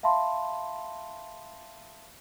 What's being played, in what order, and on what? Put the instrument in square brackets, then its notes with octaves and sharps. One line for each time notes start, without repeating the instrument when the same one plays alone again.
[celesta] E5 F5 A5 B5 C6